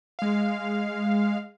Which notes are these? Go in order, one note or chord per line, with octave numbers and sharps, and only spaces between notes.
G#3 F5